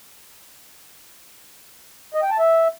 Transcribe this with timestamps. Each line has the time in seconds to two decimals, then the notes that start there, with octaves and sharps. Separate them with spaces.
2.14 D#5
2.22 G5
2.31 A5
2.39 E5